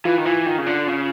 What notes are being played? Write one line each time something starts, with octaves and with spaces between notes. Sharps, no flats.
E3 F4
D#3
E3
D#3
C#3
D3
C#3